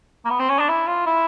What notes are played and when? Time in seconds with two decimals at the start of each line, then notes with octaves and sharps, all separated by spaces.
0.25 A#3
0.30 B3
0.39 C4
0.49 C#4
0.59 D4
0.68 E4
0.87 F4
1.06 E4